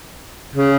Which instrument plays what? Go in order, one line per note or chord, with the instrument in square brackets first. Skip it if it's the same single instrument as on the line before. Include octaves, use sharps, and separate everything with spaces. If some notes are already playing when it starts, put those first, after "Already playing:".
[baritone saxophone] C#3